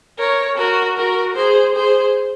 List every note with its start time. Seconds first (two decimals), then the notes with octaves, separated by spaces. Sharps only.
0.17 A#4 C#5
0.57 F#4 A#4
0.96 F#4 A#4
1.35 G#4 C5
1.74 G#4 C5